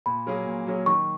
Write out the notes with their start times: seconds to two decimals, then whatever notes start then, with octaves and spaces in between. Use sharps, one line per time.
0.06 A#2 B5
0.26 F#3 A#3 C#4 G#4
0.47 A#2
0.67 F#3 A#3 C#4 G#4
0.86 D#3 C#6